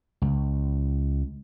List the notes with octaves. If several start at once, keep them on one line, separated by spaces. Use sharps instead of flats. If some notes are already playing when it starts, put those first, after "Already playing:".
C#2